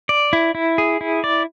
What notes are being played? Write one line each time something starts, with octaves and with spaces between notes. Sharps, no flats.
D5
E4
E4
G#4
E4
D5